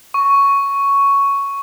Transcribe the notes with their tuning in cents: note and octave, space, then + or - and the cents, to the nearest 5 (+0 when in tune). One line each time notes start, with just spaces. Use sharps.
C#6 +5